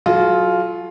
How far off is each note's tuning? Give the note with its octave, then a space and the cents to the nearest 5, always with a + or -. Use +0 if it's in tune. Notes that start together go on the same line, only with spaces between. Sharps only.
F#3 -10 F4 +0 A4 -45